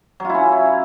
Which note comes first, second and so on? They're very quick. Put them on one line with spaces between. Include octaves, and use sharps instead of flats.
F#3 F4 E4 C#4